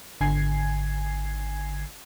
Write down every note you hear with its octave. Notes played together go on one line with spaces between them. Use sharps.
G#1 D3 G#5 G#6 C7